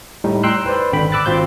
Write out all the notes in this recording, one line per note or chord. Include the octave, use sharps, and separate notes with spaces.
A2 G3 D#4
G5 A#5 C6 E6 F#6
B4 C5 D5
G#1 D3 G5 B5
B5 D6 E6 F#6 A6
G#1 C4 F4 F#4 C5 G6